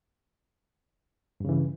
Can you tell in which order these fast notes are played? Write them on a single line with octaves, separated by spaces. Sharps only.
G2 C#3 E3